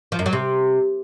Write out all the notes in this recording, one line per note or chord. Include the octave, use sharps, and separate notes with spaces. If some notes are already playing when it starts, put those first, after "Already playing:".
F3
F#2
F#3
C3